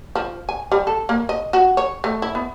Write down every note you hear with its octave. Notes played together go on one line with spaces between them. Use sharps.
F3
G#5
G3
A4
A#3
D#5
F#4
C#5
A3
E4
B3